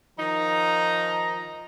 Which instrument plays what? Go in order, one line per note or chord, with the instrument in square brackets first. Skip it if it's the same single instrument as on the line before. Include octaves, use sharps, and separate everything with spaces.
[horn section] D#3 F3 D#4 A#5